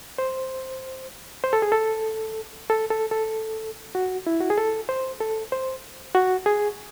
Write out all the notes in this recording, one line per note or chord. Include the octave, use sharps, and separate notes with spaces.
C5
C5
A4
G#4
A4
A4
A4
A4
F#4
E4
F#4
G#4
A4
C5
A4
C5
F#4
G#4